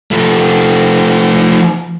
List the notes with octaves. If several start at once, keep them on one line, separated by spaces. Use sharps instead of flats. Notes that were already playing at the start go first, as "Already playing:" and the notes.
F3 A3